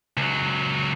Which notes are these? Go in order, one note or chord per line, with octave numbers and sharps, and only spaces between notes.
C#2 F#3